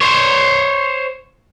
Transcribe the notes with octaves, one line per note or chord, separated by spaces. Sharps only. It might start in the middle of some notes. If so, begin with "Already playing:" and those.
C5 C#5